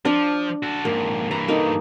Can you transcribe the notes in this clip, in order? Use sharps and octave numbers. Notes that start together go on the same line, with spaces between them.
F3 D4
F#4 A4
F2 G#2 A#3
G2 E3 A#5
A#3 D#4 A4